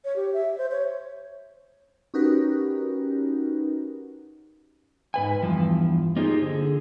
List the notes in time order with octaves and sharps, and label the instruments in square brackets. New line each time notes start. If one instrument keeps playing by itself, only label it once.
[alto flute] C#5
G4
E5
C5
C#5
[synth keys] C#4 D#4 F#4 G4 A#4 B4
[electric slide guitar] G#2 B4 G#5
E2 G2 F3
A#3 D#4 F4 G4 G#4 C5
D3 G#4